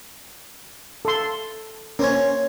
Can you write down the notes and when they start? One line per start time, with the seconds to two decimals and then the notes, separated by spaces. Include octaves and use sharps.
1.05 A4 C6
1.99 A#3 C#4 C5 C#5